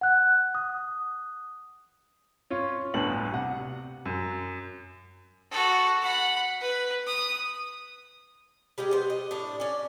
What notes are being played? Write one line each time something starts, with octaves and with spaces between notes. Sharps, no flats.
F#5 F#6
D#6
C#4 F4 C#5
G1 D2 A2 B3 A5 F#7
C3 F#5
F#2
F#4 A4
F#5 B5
B4
D#6
G3 G#3 G4 D#5
B3 C5
D#5
A2 D4
C#4 D5